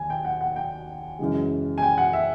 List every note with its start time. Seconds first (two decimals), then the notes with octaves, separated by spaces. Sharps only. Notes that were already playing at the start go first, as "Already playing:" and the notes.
Already playing: D#2 G#5
0.10 G5
0.25 F#5
0.41 F#5
0.56 G5
1.19 F#2 C#3 E3 G#3
1.78 G#5
1.82 G5
1.98 F#5
2.13 E5